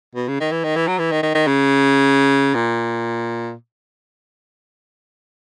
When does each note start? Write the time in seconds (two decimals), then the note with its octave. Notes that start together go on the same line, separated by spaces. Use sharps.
0.15 B2
0.28 C#3
0.40 D#3
0.52 E3
0.64 D#3
0.76 E3
0.88 F#3
0.99 E3
1.12 D#3
1.23 D#3
1.35 D#3
1.47 C#3
2.55 A#2